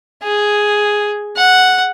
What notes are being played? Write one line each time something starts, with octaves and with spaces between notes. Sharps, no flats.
G#4
F#5